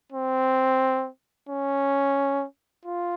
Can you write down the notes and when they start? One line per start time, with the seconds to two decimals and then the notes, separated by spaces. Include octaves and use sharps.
0.13 C4
1.49 C#4
2.85 F4